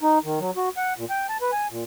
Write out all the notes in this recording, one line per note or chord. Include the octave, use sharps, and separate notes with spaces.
D#4
D#3
F#3
F#4
F#5
A#2
G5
A5
B4
G#5
A#2